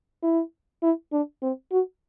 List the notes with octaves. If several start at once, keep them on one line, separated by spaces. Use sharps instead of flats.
E4
E4
D4
C4
F#4